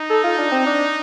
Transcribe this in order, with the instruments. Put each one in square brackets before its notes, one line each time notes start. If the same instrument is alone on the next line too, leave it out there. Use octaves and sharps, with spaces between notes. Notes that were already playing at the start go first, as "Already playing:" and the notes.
Already playing: [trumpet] D#4
[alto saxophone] A4
F4
D4
C4
D4